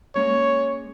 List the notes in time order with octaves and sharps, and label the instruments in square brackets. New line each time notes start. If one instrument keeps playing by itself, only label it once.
[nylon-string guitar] G#3 A#3 C#4 [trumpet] C#5